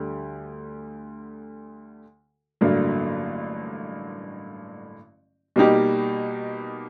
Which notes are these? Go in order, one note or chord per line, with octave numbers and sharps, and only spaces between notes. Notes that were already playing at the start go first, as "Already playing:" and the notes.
Already playing: D2 D3 G3
A1 G2 D3 F#3 A#3
B2 G3 A#3 D#4 G4